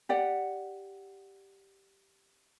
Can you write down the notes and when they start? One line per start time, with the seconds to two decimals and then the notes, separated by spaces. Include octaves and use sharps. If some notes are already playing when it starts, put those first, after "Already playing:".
0.09 G4 D5 F#5